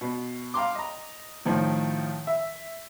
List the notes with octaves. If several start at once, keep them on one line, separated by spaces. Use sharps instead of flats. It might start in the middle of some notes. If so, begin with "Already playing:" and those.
B2
F5 G5 A#5 C6 D6
D#5 A#5
A2 D#3 F3
E5